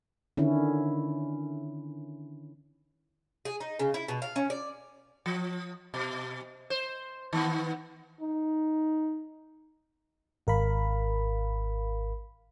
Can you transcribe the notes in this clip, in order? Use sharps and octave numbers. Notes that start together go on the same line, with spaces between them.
D3 D#3 C#4 E4
G#4
D#4
C#3
E4
B2
F5
C#4
D5
F3
B2
C5
D#3 B3
D#4
G#1 A#4 F5 B5